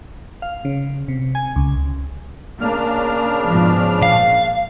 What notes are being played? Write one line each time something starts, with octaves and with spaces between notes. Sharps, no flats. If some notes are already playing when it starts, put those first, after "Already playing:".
F5
C#3
C3
G#5
C#2
C#3 A#3 D4 F6
G#2 B2 F3
A#2 F5